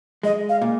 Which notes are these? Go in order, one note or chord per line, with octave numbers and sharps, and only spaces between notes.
G#3 D#5
F5
A#2